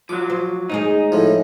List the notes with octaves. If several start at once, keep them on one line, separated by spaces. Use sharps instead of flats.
F3 F#3 D6
C5
D#2 G#2 D#4 G#4
A2 F3